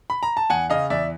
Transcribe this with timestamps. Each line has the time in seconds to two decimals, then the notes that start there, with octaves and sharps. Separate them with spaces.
0.10 B5
0.23 A#5
0.37 A5
0.49 E2 F#5 G#5
0.70 C#3 D#5 F5
0.90 E2 D5 E5